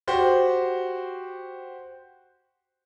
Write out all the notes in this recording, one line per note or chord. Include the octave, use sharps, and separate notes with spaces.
F#4 G4 C5